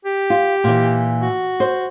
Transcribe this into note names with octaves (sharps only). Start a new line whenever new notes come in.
G4
F4
A#2 E3
F#4
C5